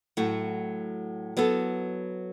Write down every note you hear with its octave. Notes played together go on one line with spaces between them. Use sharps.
A2 F#3 A3 F#4
F#3 B3 A4